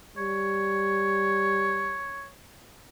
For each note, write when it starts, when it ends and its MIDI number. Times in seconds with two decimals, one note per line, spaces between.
0.17 2.00 55
0.17 2.28 73